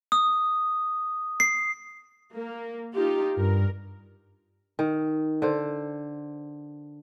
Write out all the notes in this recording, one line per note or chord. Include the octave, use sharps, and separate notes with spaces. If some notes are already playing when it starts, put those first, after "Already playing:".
D#6
C7
A#3
D#4 F4 G4
G2 A#4
D#3
D3 C5